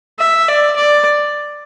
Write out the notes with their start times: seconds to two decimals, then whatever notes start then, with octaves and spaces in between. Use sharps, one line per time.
0.19 E5
0.48 D5
0.76 D5